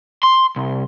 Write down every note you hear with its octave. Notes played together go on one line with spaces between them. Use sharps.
C6
C2